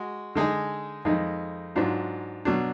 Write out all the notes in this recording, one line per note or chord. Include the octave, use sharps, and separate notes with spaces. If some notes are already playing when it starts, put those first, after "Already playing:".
Already playing: G#3 F#4
D3 G#3 D#4 G#4
F2 D#3 G#3 D#4
G#2 F#3 D4 F4
B2 F#3 D4